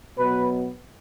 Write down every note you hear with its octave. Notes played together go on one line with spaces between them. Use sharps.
B2 F#3 B3 B4